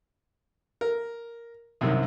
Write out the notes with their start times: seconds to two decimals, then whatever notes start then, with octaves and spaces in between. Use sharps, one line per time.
0.81 A#4
1.81 C2 F#2 C3 D#3